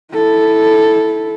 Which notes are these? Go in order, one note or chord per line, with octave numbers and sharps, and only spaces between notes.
E4 A4